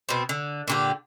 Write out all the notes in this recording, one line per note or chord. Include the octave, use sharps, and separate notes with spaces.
B2 C4
D3
A#2 D3 G4